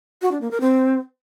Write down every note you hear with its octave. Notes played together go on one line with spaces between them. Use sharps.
F#4
D4
A#3
A#4
C4